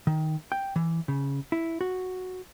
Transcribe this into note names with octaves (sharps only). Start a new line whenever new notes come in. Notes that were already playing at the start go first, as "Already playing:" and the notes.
D#3
G5
E3
C#3
E4
F#4